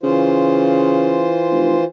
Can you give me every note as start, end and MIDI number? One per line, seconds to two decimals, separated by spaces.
0.03 1.37 49
0.03 1.84 52
0.03 1.84 65
0.03 1.84 72
1.51 1.77 29